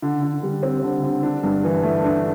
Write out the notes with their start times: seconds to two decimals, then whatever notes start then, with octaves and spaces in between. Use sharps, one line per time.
0.02 D3
0.22 D3
0.43 G3
0.63 C4
0.83 D3
1.03 D3
1.23 D4
1.43 G2
1.64 E3
1.83 A3
2.04 D4